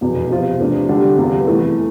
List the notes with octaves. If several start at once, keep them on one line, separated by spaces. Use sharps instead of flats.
F1 E2 B2
C3 F3 C4 F4
E2 C3 F3 A3 D4
D3 G3 D4 G4
E2 C3 G3 B3 F4
F2 E3 A3 E4